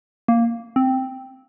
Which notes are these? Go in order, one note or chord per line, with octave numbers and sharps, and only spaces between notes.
A#3
C4